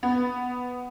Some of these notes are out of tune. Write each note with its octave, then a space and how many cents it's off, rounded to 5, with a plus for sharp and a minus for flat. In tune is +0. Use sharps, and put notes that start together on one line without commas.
B3 +5